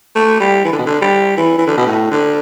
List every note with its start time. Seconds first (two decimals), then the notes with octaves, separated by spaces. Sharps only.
0.16 A3
0.40 G3
0.65 E3
0.72 D3
0.79 B2
0.86 D3
1.01 G3
1.37 E3
1.58 E3
1.67 D3
1.77 B2
1.86 A2
2.11 D3